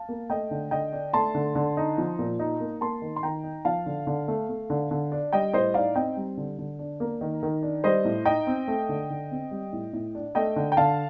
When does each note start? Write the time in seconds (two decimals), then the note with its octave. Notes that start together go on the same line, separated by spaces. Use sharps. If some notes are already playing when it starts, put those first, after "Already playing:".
Already playing: F5 A5
0.09 A#3
0.30 A3 D#5 G5
0.51 D3
0.71 D3 D#5 G5
0.93 D4
1.13 A3 A5 C6
1.34 D3
1.55 D3
1.77 D#4
1.98 F3
2.19 A#2
2.39 D#4
2.60 A#3
2.81 A#3 A5 C6
3.02 D#3
3.16 C6
3.23 D#3 G5 A#5
3.44 D#4
3.65 F3 F5 A5
3.86 D3
4.07 D3
4.28 A3
4.49 A3
4.70 D3
4.91 D3
5.12 D4
5.33 G3 D#5 G5
5.53 A2 C5 D#5
5.74 D#4 D5 F5
5.95 C4 D#5 G5
6.17 G3
6.37 D3
6.58 D3
6.79 D4
7.00 A#3
7.21 D#3
7.43 D#3
7.63 D4
7.84 G3 C5 D#5
8.05 A2
8.25 D#4 D#5 G5
8.47 C4
8.68 A3
8.89 D3
9.10 D3
9.31 C4
9.51 G3
9.73 A2
9.93 A2
10.15 D4
10.35 A3 D#5 G5
10.56 D3
10.72 G5
10.77 D3 F5 A5